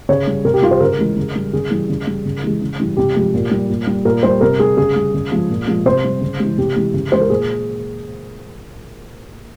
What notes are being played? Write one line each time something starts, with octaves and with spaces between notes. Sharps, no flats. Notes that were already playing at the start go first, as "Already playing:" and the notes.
C#3 C#5
G3
C3 A#4
G4
G3 F4
C5
C#3 A#4
E3 G#3
C#3
G3
C#3 G#4
E3 G3
C#3
G3
C#3
E3 G#3
C#3
E3 G3
C3 G4
F3 G#3
A#2
G3
A#2
G3
A#2 A#4
G3 C5
C3 A#4
G3 G#4
C#3 G#4
G3
C#3
F3 G#3
A#2
F3 G#3
C3 C5
G3
C#3
E3 G#3
C3 G4
E3 G#3
C#3
E3 G#3 C5
A#4
A#2 G#4